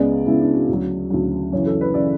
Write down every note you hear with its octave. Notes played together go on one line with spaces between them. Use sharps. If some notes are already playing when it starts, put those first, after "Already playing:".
Already playing: C#2 C#3 G#3 B3 D5
C#2 C#3 G#3 B3 E4
D4
F#4
D2 C#3 F#3
D2 C#3 F#3
F#2 C#3 E3 C#5
A4
B4
C#3 E3 D5